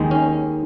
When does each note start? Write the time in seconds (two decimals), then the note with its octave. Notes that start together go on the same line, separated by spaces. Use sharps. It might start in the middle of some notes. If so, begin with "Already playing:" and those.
Already playing: D#2 D#3 G#3
0.11 C#4